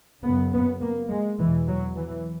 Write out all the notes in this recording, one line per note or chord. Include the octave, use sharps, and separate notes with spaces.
F#2 C#3 B3
B3
A#3
G#3
E2 B2 E3
F#3
E3